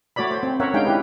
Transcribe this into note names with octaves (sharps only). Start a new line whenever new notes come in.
A3 F#4 C#5 D5 B5
C5
C4
C#4 A#4 C#5 E5 F#5
G#3 D4 D#4 G4 F5 G5
E4 G4 B4